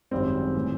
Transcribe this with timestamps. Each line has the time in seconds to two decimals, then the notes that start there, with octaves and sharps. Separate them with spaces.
0.11 G#1 F#2 D#3 G3 C4
0.55 A2 E3